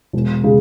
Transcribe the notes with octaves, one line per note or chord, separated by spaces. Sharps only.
E1
C#3 G#3